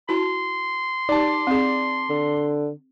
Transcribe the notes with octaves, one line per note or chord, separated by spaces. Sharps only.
E4 F#4 A5 C6
D#4 G4 D5 A5
C4 G#4
D3